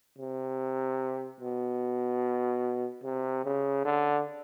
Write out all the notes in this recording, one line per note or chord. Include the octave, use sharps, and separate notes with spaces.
C3
B2
C3
C#3
D3